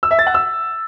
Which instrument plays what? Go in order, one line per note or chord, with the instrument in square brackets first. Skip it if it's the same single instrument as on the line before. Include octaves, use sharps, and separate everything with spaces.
[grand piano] E6
E5
A6
F#5
E6